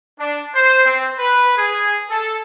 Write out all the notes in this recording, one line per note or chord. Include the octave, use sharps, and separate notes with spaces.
D4
C5
C4
B4
G#4
A4